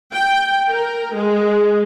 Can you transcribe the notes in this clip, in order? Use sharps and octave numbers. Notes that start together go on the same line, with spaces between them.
G5
A#4
G#3